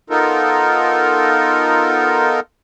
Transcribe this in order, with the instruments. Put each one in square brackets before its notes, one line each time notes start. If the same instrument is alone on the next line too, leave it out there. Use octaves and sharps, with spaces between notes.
[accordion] B3 D#4 F4 A4 A#4